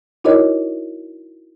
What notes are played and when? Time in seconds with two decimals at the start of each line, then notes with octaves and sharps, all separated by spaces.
0.24 D#4 E4 F#4 A#4 C#5 D#5